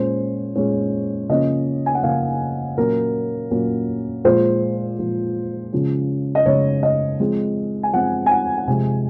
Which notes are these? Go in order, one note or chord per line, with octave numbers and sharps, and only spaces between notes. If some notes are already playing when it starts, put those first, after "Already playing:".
Already playing: A#2 G#3 C#4 C5
A#2 G#3 C#4 C#5
C#3 F3 A#3 C#4 D#5
G#5
F#5
C#3 F3 A#3 C#4 F5
A#2 F#3 A#3 C#4 A#4
A#2 F#3 A#3 C#4
A#2 F3 G#3 C5
A#2 F3 G#3
C#3 F3 G#3 C#4
D#5
C#3 F3 G#3 C#4 C#5
D#5
F3 G#3 C4
G#5
F3 G#3 C4 F#5
G#5
F#5
F#5
C3 F3 G#3 G#5